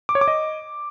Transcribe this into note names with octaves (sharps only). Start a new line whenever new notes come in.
D6
C#5
D6
D#5